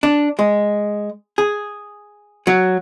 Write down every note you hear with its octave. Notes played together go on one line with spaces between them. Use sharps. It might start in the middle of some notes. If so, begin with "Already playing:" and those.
D4
G#3
G#4
F#3